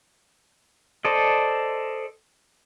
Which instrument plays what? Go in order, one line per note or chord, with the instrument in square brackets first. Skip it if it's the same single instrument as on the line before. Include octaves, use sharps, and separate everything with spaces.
[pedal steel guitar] A4 C5 D5 D#5